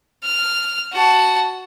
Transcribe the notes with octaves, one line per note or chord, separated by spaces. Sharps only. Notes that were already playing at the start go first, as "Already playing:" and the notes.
F6
F#4 A5